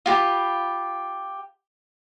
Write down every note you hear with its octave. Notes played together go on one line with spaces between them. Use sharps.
F4 G4 B5